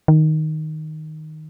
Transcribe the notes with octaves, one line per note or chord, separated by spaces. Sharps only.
D#3